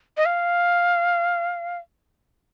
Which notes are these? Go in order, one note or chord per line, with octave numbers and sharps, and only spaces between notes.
D#5
F5